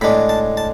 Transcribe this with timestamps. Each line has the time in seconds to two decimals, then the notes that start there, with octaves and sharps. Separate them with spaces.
0.01 A2 G#3 D4 B5
0.29 A5
0.57 A5